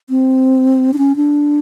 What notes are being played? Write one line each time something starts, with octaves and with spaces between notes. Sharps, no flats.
C4
D4
C#4
D4